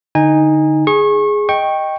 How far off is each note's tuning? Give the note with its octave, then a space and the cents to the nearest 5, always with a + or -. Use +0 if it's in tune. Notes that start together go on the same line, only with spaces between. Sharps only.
D3 +0 D#4 +0 G#5 -25
G#4 +0 C#6 -30
D#5 +0 G5 +0 C#6 -15